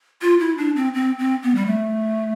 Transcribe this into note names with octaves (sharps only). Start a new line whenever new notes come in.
F4
E4
D4
C4
C4
C4
B3
G3
A3